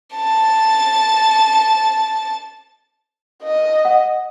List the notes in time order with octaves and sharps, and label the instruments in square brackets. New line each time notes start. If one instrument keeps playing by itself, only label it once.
[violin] A5 A6
[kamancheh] D#5
[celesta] F#5